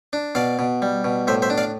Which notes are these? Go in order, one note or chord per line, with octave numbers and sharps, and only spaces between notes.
D4
B2 D5 F5
B2
G3
B2
A2 C5 E5
C5 E5
D4
D5 F5